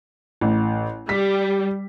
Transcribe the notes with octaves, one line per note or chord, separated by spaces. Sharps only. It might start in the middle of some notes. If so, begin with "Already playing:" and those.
A1
G3 B6